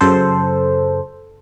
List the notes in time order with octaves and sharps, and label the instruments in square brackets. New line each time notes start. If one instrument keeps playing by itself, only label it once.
[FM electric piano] F#2 C#3 A4 C5